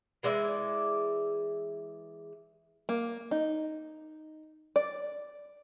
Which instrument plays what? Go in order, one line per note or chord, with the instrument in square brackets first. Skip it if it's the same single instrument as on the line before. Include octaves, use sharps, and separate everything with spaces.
[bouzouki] E3 G#3 D5 E5
[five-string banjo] A#3
D#4
D5